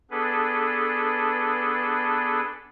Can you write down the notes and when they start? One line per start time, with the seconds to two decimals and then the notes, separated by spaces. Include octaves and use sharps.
0.11 B3 D4 G#4 A4 B4